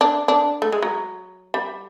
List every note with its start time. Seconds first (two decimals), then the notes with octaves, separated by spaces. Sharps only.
0.01 D4
0.28 D4
0.62 A3
0.72 G#3
0.82 F#3
1.54 G3